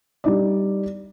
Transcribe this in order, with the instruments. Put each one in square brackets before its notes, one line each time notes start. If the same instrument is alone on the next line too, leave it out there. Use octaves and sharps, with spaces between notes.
[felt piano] G3 D#4 D5